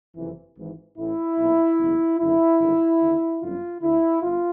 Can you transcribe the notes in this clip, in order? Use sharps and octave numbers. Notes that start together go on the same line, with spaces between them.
F#1 F2 C3 E3
G#1 G#2 E3
A1 A2 E3 E4
B1 A#2
F#1 E2 B2
F#1 F#2 D3 E4
G#1 G2 D3
D#2 D3
G1 F#2 D3 F4
D2 D3 E4
G1 F4